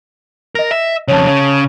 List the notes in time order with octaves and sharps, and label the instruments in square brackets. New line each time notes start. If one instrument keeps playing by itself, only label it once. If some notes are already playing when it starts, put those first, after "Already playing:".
[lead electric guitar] A#4 [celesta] D#5 A#6
[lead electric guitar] E5
[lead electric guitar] F2 C#3 [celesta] C#5 A5
[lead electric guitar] C#3